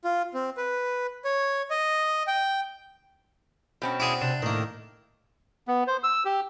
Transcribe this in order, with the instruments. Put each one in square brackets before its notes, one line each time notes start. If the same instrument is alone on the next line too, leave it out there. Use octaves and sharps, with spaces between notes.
[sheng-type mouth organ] F4
C4
B4
C#5
D#5
G5
[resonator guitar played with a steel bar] B2 C4 C#4
[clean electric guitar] E4 G#4 [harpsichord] D5 F#5 C6
[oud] C3 [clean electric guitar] D4
[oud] A2 [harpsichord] D#3 A#3
[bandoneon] B3
C5
E6
G4